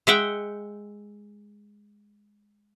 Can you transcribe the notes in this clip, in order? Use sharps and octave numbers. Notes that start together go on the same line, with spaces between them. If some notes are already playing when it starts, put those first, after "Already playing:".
G#3 E5 F#5 G5